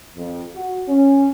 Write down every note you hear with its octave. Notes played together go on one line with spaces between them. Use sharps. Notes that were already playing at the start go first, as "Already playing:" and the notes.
F2
F#4
C#4